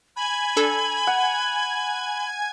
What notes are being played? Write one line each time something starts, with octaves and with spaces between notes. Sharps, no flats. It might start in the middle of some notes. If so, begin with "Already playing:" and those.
G#5 B5 G#6
D4 A4
F#5